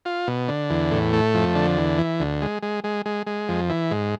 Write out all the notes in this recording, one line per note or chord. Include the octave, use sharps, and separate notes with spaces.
F4
B2
D3
E2
A2
A3
F2
D3
E2
E3
D2
G#3
G#3
G#3
G#3
G#3
F2
E3
G#2